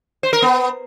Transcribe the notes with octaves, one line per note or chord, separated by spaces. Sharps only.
C5
A#4
B3